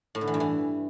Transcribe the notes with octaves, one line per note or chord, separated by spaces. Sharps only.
A2
D3
E3
G2
E3